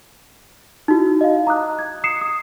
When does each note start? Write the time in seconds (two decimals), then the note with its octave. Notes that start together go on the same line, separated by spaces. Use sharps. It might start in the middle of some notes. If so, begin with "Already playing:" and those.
0.88 D#4 E4 F#4
1.21 D#5 F5
1.47 A#5 D6 D#6 F#6
1.79 G#6
2.04 D#6 C7 C#7 E7
2.21 D#6